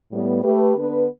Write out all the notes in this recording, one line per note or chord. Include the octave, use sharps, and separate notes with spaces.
A2 G3 B3
A3 G4 B4
D3 B3 D4 B4